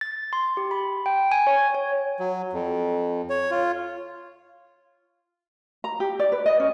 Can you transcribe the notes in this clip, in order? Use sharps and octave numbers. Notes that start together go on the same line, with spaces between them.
A6
C6
G4
B5
G5
G#5
C#5
C#5
F#3
F2
C#5
F4
A#5
G4
D5
B4
D#5
C#4